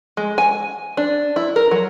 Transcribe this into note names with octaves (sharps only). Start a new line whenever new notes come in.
G#3
G#5
D4
E4
A#4
F#3